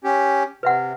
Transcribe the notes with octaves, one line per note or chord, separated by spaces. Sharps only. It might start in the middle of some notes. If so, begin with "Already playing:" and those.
C#4 G4
C3 B4 E5 F#5